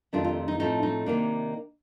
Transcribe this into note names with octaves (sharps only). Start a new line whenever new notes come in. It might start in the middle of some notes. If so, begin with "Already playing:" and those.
F2 C3 D#3 A3 D4 F4
F4
D#4
A2 F3 A3 C4 D#4
D#4
C3 D#3 A#3 D4